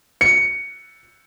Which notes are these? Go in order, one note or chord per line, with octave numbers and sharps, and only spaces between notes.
C#7